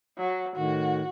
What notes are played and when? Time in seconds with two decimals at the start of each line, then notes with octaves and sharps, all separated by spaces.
0.18 F#3
0.56 A2 D#3 F#4